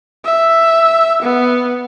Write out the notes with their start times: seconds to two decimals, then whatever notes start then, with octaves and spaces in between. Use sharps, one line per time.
0.25 E5
1.23 B3